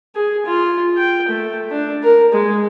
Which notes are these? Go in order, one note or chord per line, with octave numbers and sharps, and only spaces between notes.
G#4
F4
G5
A3
D4
A#4
G#3